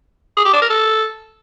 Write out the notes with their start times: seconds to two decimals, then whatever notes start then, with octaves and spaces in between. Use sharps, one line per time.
0.37 G#4
0.45 G4
0.54 D4
0.62 A#4
0.70 A4